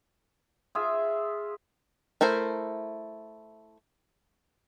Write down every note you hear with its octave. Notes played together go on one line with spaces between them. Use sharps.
F4 G#4 E5
A3 E4 A#4 C5